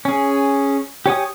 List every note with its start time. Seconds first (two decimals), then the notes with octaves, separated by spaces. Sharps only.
0.05 C#4 G#4
1.06 G4 C#5 G#5 D#6